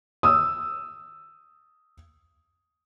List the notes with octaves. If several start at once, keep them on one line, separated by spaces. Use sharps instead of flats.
D#6 E6